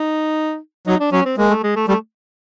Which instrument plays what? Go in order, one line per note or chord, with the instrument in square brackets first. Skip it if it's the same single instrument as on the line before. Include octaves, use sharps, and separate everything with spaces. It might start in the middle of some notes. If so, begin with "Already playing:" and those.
Already playing: [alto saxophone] D#4
[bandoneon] F#3 [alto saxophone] D#4
[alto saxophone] D4
[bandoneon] F#3 [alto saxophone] C#4
[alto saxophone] C4
[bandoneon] G#3 [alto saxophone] A#3
[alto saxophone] A3
G#3
A3
[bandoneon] G3 [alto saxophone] A3